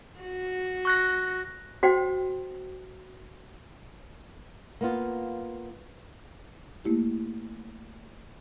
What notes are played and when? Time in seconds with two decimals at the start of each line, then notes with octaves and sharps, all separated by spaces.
0.20 F#4
0.85 C#6 F#6 A#6
1.83 F#4 C5 G5
4.81 A#3 B3 F4
6.84 A3 A#3 E4 G4